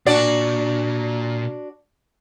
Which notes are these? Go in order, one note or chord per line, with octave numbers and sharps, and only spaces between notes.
A#2 D4 F#4 D5